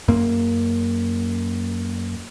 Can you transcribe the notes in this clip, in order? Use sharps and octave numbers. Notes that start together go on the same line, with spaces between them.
F#2 A#3